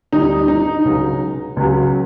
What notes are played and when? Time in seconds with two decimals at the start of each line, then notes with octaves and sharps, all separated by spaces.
0.12 D2 D3 G3 D#4
0.48 D#4
0.85 C#2 C#3 F#3
1.57 C#2 C#3 F#3